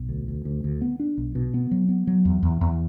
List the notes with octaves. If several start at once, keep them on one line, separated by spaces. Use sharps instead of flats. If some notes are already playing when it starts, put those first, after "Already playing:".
Already playing: B1
D2
D2
D2
D2
B3
D4
B1
B2
B3
F#3
B3
F#3
E2
E2
E2